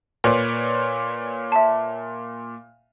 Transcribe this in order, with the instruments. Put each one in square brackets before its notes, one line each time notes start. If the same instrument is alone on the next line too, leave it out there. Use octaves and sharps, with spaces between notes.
[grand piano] A#2 [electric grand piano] B4 C#5 D5
[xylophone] E5 A5